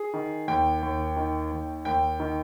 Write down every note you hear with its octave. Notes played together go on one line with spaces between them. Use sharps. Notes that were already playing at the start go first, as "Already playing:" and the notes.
Already playing: G#4
D#3
D#2 G5
D#2
D#3
D#2
D#2 G5
D#3